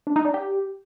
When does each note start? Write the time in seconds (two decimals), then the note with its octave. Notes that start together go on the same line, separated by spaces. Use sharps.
0.07 D4
0.16 D#4
0.25 D4
0.34 G4